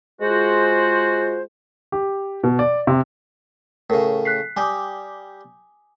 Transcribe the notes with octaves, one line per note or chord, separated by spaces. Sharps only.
G#3 F4 F#4 C5
G4
B2
D5
C3
A2 C#3 A#4
F#6 B6 C7
G3 G4 G#5 D6 D#6